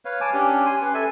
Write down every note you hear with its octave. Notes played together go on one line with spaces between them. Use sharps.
B4 C#5 F5
C#5 G#5 A5 D6
C#4 D4 G4
G#5 C6
C#4 B4
A4 E5 G#5